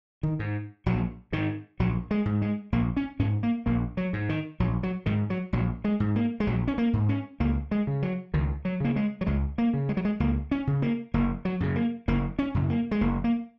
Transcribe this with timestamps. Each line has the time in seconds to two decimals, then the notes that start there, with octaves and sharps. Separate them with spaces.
0.23 D#3
0.39 G#2
0.86 A#1 F#3
1.32 G#2 D#3
1.79 A#1 F#3
2.11 G#3
2.26 G#2
2.42 G#3
2.72 A#1 A#3
2.97 C#4
3.19 G#2 C#4
3.43 A#3
3.66 A#1 A#3
3.97 F#3
4.13 G#2
4.29 D#3
4.60 A#1 F#3
4.83 F#3
5.06 G#2 D#3
5.30 F#3
5.53 A#1 F#3
5.84 G#3
6.00 G#2
6.16 A#3
6.40 G#3
6.47 A#1 F#3
6.68 C#4
6.78 A#3
6.93 G#2
7.09 C#4
7.40 C#2 A#3
7.71 G#3
7.87 C#3
8.02 F#3
8.34 C#2 D#3
8.65 F#3
8.80 C#3 A#3
8.96 G#3
9.21 F#3
9.27 C#2 G#3
9.58 A#3
9.73 C#3
9.89 G#3
9.97 F#3
10.05 G#3
10.20 C#2 A#3
10.51 C#4
10.67 C#3
10.82 A#3
11.14 F#1 A#3
11.45 F#3
11.60 F#2 C#3
11.76 A#3
12.08 F#1 A#3
12.39 C#4
12.54 F#2 C#3
12.70 A#3
12.91 G#3
13.01 F#1 A#3
13.24 A#3